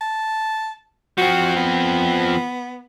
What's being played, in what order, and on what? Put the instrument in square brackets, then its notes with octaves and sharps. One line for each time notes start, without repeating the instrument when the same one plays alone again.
[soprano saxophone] A5
[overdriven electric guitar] F3 C4 [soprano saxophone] F#4
[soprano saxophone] B3